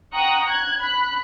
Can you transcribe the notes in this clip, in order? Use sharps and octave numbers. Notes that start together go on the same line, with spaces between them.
F#5 G5 A#5 C#6 D#6 F#6
F#6 G#6
B5 F#6